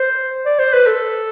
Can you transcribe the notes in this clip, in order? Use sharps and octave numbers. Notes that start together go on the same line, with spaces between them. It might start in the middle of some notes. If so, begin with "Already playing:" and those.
Already playing: C5
D5
C5
B4
A4